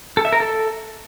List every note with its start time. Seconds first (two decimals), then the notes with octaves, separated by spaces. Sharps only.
0.17 A4
0.25 E5
0.33 A#4
0.40 A4